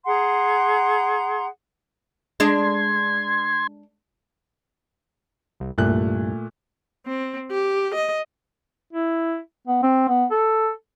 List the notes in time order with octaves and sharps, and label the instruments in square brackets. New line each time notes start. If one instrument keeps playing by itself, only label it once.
[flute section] G#4 F#5 A#5 C6
[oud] G#3 D4 [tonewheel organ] C6 G#6
[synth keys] C2
[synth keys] C2 G2 [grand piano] A#2 A3 F#6
[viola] C4
G4
D#5
[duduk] E4
B3
C4
B3
A4